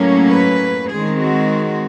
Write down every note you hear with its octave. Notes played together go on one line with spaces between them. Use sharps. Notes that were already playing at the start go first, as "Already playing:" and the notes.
Already playing: A2 F#3 A#3 C#4
B4
D#3 G#3 C4 G#4
F#4